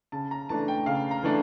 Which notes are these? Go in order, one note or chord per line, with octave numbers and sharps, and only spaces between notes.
C#3 A5
A#5
E3 A3 D4 A5
G5
C#3 F5
A#5
E3 A3 D4